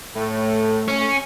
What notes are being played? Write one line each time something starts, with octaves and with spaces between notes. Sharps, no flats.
A2 A3
C#4